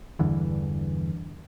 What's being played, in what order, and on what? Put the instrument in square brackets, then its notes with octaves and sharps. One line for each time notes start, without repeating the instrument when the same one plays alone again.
[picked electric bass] E2 G2 D3 E3